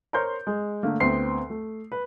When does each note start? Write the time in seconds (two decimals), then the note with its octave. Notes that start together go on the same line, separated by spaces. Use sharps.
0.13 A#4 C5 C#5 C6 G6
0.47 G#3
0.83 D3 A3 A#3
1.00 D2 B3 C4 C6 C7
1.50 A3
1.92 B4